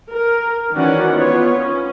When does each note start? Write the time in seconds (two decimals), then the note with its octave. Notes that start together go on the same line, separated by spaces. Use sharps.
0.11 A#4
0.75 D#3 E3 C#4 F#4 D5 F#5
1.12 B3 F4 C#5
1.59 C#4